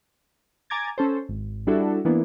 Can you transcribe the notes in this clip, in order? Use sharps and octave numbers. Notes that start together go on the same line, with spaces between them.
G#5 A#5 D6 G#6 A6
C#4 A4 C5
G#1
G3 D4 E4 F#4 A4
E3 A#3 B3 D4 E4